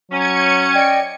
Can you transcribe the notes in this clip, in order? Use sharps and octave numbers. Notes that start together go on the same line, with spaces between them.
F#3 C#4 G#6 C#7
D5 D#5 G5